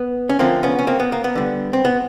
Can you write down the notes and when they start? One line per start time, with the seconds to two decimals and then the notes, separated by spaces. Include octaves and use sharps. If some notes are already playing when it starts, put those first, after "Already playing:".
Already playing: B3
0.29 C#4
0.39 D3 F3 A3 A#3 C4
0.63 B3 C#4
0.79 C#4
0.87 A#3 C4
1.00 B3
1.12 A#3
1.24 B3
1.35 D3 G3
1.73 C4
1.85 B3